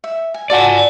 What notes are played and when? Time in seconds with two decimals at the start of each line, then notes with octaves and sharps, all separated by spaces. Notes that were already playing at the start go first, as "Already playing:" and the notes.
0.04 E5
0.34 G#5
0.50 F#4 A4 D5 G#5 D6